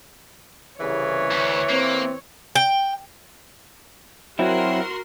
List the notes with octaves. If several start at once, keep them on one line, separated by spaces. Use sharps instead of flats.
C2 C#3 E3 C#5
D2
A#3 C4
G5
F#3 C4 E4 F#4 A#4 C6